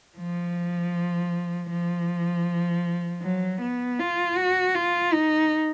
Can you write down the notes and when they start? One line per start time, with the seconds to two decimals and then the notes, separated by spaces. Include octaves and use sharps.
0.18 F3
1.70 F3
3.22 F#3
3.61 B3
3.99 F4
4.37 F#4
4.75 F4
5.13 D#4